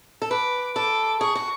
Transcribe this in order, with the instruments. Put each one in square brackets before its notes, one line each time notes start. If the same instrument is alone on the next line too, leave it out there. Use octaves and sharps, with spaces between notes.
[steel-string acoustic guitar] A4
[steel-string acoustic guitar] B4 [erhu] D6
[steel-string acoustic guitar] A4 [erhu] D6
[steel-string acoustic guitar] G#4 [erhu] C#6
[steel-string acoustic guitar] F#4